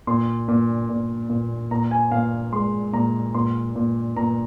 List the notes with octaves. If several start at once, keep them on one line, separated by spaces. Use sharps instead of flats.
A#2 C6
A#2
A#2
A#2
A#2 A#5
G#5
A#2 F5
G#3 C6
A#2 A#5
A#2 C6
A#2
A#2 A#5